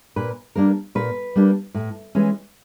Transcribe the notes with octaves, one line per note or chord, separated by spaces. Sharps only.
A#2 B4
G3 A#3 D4 A#4
A#2 B4
G3 A#3 D4
A2
E3 G#3 C#4